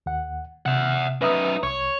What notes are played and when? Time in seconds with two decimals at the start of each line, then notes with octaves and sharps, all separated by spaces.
0.06 D#2 F#5
0.66 C3 E5 F#5
1.21 F#2 D#4 B4 E5 D#6
1.63 C2 C#5 C#6